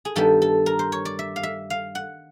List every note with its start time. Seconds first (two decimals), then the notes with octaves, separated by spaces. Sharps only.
0.05 G#4
0.16 G2 D#3 G3 B3 A4
0.42 A4
0.66 A#4
0.79 C5
0.92 C#5
1.05 D5
1.19 E5
1.36 F5
1.43 E5
1.70 F5
1.95 F#5